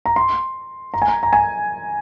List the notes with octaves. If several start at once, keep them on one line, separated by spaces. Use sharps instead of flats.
A#5
C6
A#5
G#5
A#5
A#5
G#5